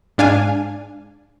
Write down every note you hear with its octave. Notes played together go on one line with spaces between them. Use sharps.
G#2 D4 F5 G#5